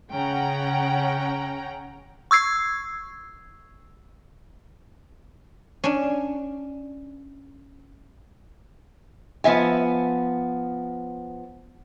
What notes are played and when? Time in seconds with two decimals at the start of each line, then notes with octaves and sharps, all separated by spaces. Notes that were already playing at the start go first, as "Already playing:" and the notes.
0.13 C#3 C#4 F#5 G5 A#5
2.31 C#6 E6 G#6 C7
5.84 C#4 D4
9.44 F3 B3 E5 G#5